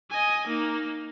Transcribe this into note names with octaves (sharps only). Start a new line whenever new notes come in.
D#5 G#5
A#3 D#4